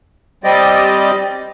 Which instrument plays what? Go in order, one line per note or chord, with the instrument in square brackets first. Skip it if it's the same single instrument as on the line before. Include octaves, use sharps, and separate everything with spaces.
[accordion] G3 C4 G4 D5 D#5